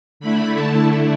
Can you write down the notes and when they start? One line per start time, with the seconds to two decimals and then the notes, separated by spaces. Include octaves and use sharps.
0.20 D3 A3 E4 B5
0.55 A5